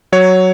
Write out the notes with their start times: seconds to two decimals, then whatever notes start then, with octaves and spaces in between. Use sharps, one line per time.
0.12 F#3 C#5